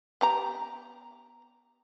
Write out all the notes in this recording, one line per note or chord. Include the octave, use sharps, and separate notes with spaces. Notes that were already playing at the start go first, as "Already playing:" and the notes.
B3 G4 A#5